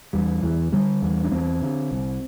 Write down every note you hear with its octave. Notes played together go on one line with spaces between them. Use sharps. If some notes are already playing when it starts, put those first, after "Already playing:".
E2 G3
E2 E3
D3 G3
E2
D4
E2 C4
D3
C2